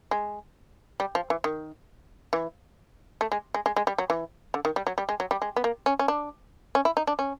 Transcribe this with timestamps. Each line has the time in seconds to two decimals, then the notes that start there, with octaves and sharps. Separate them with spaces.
0.11 G#3
1.00 G3
1.15 F3
1.30 E3
1.44 D#3
2.33 E3
3.21 A3
3.32 G#3
3.54 G#3
3.66 G#3
3.76 G#3
3.87 G3
3.98 F#3
4.10 E3
4.54 D3
4.65 D#3
4.76 G3
4.87 F#3
4.98 G3
5.09 G#3
5.20 F#3
5.31 G3
5.42 G#3
5.56 B3
5.64 A#3
5.86 C#4
5.99 C#4
6.08 D4
6.75 C#4
6.85 E4
6.97 D#4
7.07 D4
7.19 C#4